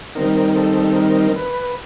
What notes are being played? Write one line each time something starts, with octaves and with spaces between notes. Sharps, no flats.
D#3 G3 C4 D#4 A#4
A#4
A4
A#4
B4